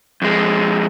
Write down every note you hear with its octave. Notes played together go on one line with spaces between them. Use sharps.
F2 G#3